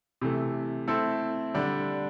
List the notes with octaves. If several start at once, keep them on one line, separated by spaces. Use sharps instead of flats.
C3 E3 A3
A3 C4 E4 A4
D3 G3 D4